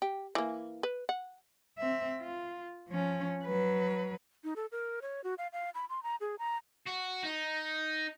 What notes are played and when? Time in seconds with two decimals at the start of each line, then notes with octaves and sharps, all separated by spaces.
0.02 G4
0.35 E3 A#3
0.83 B4
1.09 F#5
1.78 C4 E5
2.20 F4
2.88 F3 C#4
3.44 F#3 B4
4.44 D#4
4.56 A4
4.72 A#4
5.02 C#5
5.24 F#4
5.38 F5
5.53 F5
5.75 B5
5.90 C6
6.03 A#5
6.21 G#4
6.39 A#5
6.87 F#4
7.24 D#4